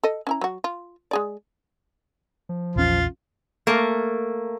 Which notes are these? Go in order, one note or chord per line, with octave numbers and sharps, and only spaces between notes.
A4 D#5
C#4 E4 A#5
F#3 F#4
F4
G#3 G#4 D5
F3
A#1 E2 C#4 F4
A3 A#3